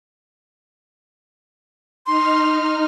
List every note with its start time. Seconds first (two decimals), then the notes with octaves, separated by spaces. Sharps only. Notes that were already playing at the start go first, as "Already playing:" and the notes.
2.07 D#4 C6 F6